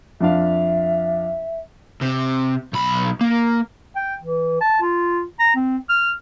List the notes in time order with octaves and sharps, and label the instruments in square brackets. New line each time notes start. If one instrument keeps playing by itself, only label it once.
[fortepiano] F2 D4 F5 [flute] E5
[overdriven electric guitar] C3
B1 B5
A#3
[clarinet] G5
E3
A5
F4
A#5
C4
F6